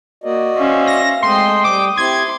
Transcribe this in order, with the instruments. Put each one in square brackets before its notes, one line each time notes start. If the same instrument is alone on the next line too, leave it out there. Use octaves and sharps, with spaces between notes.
[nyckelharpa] A#3 [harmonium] F#4 D5 D#5
[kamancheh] C#4 C5 [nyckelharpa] E5 F5
[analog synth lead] A#6
[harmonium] G#3 C4 [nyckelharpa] A3 D#5 [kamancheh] C5 G5 [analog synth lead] C6
[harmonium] G3 [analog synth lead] D6 [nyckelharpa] D#6
[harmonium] C4 E4 G4 [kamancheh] C6 D6 [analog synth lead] G#6